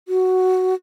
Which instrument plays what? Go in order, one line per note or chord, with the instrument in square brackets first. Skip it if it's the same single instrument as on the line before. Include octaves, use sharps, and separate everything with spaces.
[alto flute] F#4